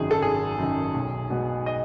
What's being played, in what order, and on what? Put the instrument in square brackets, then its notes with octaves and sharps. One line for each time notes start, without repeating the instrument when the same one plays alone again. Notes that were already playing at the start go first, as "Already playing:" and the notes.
Already playing: [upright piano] G#1 F#2 D#3 G#4
A4
G#1 G#4
F#2 D#3
B1
B2 G#3 B3
D#5